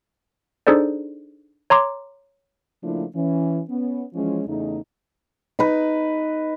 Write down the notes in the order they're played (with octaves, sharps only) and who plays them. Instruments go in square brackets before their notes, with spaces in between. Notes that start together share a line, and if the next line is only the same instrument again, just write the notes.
[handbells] D4 D#4 G#4 A4 C5 D5
C#5 A#5 C6 D6
[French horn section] C#3 F3 A3 A#3 D4 E4
E3 C#4
B3 C#4
E3 F3 G#3 C#4
E2 C#3 A3 D#4
[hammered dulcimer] D#4 B4